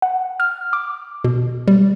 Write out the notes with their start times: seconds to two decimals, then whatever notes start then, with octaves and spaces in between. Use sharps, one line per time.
0.02 F#5
0.40 F6
0.73 D6
1.24 B2
1.68 G3